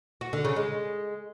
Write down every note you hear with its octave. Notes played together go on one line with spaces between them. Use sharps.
F#4
D3
C#3
G#3